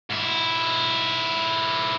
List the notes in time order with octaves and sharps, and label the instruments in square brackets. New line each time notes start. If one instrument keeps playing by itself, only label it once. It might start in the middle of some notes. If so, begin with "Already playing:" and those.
[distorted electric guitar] G#2 E4